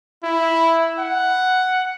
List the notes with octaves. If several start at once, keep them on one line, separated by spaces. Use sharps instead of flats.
E4
F#5